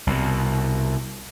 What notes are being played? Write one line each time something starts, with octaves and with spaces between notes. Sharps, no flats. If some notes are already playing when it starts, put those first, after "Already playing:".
C2 B2